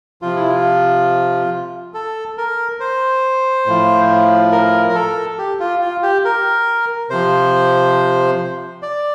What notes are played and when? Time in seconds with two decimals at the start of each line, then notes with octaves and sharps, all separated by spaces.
0.22 C3 F3 F4
0.36 E4
0.49 F4
1.94 A4
2.38 A#4
2.80 C5
3.66 A2 F3
4.52 A#4
4.89 A#4
4.95 A4
5.39 G4
5.60 F4
5.81 F4
6.03 G4
6.25 A#4
7.10 C3 F3 C5
8.82 D5